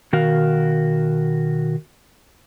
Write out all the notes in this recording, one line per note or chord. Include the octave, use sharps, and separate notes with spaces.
B2 D#3 F#4 A#4 F5